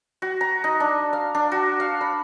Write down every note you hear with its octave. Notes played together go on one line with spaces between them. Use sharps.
F#4
A#5
D#4
D4
F5
D4
F#4
F5
B5